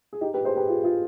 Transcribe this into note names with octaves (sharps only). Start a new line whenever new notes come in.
G#4
D#4 G4
G4 B4
G#4 C5
G4 B4
F4 G#4
F4 G#4